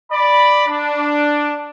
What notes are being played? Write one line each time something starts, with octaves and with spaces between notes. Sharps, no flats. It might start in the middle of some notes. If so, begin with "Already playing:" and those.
D5 B5
D4